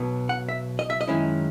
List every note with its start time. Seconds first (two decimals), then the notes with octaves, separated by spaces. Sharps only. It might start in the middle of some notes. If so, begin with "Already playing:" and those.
Already playing: B1 B2 F#3 B3
0.29 F#5
0.49 E5
0.79 D#5
0.90 E5
1.01 D#5
1.08 F#2 D#3 G#3 C#4 E4